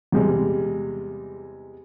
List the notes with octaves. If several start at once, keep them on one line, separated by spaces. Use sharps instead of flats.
E2 C3 G3 G#3